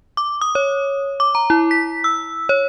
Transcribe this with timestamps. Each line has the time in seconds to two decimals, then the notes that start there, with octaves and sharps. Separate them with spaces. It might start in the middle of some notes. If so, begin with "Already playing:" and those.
0.17 D6
0.41 D#6
0.55 C#5
1.20 D6
1.35 A#5
1.50 E4
1.71 B6
2.04 E6
2.49 C#5